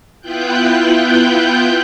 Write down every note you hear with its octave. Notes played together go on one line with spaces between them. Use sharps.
B3 E4 F4 G5 F#6 G6